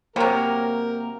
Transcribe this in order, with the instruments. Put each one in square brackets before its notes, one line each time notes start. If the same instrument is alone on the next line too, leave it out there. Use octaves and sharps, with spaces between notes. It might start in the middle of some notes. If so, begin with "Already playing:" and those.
[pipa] C3 F#3 [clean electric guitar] A#3 [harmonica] A#4 [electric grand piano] G5